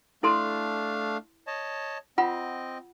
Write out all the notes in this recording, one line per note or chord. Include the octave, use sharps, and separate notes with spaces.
A3 D4 E4 A4 F5 C6
C#5 D#5 A5
C4 F4 D#5 F#5 B5